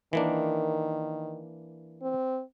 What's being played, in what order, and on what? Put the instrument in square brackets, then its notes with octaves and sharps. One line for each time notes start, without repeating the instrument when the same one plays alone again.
[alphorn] D#3 [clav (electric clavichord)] E3 A#3 D4
[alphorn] C4